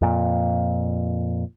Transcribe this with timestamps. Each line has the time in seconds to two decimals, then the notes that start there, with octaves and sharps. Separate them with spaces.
0.02 F2 A#2